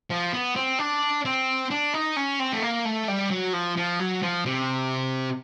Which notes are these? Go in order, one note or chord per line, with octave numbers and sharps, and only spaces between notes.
F3
B3
C4
D4
C4
D4
D#4
C#4
C4
A3
A#3
A3
G3
F#3
F3
F3
F#3
F3
C3